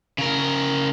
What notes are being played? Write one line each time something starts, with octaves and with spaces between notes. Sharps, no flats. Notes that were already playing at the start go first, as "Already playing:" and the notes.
C#3 A#4